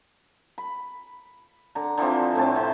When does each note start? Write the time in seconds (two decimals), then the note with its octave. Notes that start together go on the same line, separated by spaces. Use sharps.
0.58 B5
1.75 D3 A#5
1.98 D3 E3 F3 C4
2.35 A2 A3 C4 A5
2.56 C3 C5